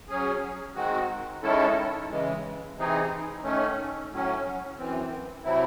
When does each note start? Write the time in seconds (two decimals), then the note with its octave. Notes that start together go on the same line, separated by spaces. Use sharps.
0.09 F#3 C#4 G#4
0.75 D#3 G#3 C4 F#4
1.43 D#3 G#3 C#4 E4 A4
2.10 C#3 E3 G#3
2.76 C3 E3 C4 D#4 G#4
3.43 D#3 A3 C#4
4.11 A2 F#3 C#4
4.78 F#2 E3 C4
5.44 C3 F#3 A3 C4 E4